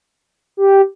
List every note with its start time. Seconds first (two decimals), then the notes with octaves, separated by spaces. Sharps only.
0.57 G4